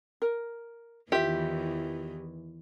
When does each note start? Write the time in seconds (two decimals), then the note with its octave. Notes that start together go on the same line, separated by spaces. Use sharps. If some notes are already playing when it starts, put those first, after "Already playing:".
0.22 A#4
1.12 E2 D#3 E3 F4 G4 E5